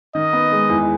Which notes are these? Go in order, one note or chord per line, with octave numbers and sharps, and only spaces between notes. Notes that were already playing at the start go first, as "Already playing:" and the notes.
D#3 D#5
B3
G#3
E2